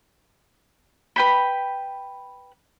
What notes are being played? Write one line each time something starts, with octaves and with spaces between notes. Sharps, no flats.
B4 G5 B5